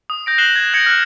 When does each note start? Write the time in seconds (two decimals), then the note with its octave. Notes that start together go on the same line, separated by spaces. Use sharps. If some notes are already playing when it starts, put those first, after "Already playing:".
0.10 D#6
0.26 G6 A#6 D7
0.38 F#6 C7 E7 F#7 G7
0.56 G#6 E7
0.74 F#6 G#6 A#6 C#7 D7
0.86 F6 F#6